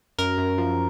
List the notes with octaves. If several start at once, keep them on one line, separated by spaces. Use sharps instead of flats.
F#2 A#4
F#2
F3